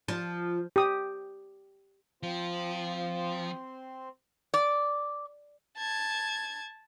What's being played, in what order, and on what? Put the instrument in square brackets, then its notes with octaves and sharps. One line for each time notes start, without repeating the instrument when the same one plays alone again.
[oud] F3
[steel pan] G4 D#6
[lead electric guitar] F3 [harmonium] C4 C5 [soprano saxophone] F4
[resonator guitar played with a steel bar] D5
[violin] A5 G#6